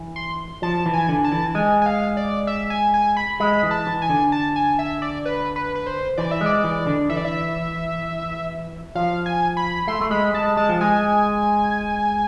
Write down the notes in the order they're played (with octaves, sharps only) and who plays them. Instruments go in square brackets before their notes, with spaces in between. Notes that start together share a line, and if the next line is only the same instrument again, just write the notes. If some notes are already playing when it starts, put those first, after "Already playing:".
Already playing: [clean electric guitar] E3
[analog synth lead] C6
[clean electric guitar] F3 [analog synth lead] A5
[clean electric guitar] E3
[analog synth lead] G#5
[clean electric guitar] D3
[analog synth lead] A5
[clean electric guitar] E3
[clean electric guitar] G#3 [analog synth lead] G#5
[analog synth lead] G#5
F5
D5
E5
G#5
G#5
B5
[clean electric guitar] G#3 [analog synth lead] B5
[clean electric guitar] E3
[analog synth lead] A5
[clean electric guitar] E3
[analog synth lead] G#5
[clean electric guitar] D3
[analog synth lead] A5
G#5
E5
D5
B4
B4
B4
C5
[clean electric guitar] E3 [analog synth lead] D5
[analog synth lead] E5
[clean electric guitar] G#3
[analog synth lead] D5
[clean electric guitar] E3
D3
[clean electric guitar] E3 [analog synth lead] E5
[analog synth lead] D5
E5
[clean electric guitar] F3 [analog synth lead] F5
[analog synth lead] G#5
B5
[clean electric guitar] A3 [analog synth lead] C6
[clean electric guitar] A3
[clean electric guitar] G#3 [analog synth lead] B5
[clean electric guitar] G#3 [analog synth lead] A5
[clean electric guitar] G#3 [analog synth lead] A5
[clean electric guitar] F3
[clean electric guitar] G#3 [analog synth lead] G#5